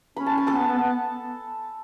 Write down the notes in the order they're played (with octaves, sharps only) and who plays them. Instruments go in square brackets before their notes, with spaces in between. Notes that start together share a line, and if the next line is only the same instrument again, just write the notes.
[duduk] C#4 [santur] B5
[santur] A5
G#5
A4 A5
[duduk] B3
B3
B3